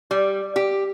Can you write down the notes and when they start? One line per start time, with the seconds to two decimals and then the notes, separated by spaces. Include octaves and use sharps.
0.11 G3
0.56 G4